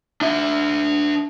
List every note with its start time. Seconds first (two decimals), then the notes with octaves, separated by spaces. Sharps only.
0.22 D4 E5